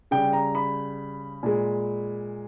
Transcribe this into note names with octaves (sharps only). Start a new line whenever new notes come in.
C#3 G3 G5
A#5
B5
A#2 G#3